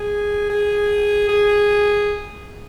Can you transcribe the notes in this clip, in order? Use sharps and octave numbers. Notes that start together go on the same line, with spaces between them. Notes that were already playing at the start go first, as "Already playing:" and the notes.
Already playing: G#4
G#4
G#4